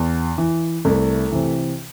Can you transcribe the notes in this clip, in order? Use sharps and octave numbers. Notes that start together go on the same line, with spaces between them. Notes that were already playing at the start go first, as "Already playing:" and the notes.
Already playing: E2
E3
C2 A3
C3 E3